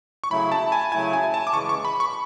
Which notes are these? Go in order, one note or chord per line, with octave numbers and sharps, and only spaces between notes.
C#6
C#3 F#3 A3 E4 B5
A5
G#5
C#3 F#3 A3 E4 G#5
G#5
A5
D6
C#3 E3 G#3 C#6
C#6
B5
C#6